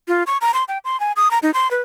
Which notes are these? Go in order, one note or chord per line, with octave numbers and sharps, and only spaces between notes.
F4
C#6
A#5
C6
G5
C6
G#5
D#6
A#5
D#4
C6
B4